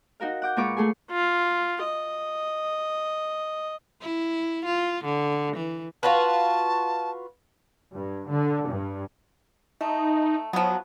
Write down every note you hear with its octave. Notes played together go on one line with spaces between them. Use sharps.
D#4 F#4 A#4 F5
F#5 D6 G6
A#2 G#3 F4 B4 C#6 D6
A3 G#4 G#5
F4
D#5
E4
F4
D3
E3
F4 F#4 B4 A5
G2
D3
G2
A3 D#4
F3 F#3 B3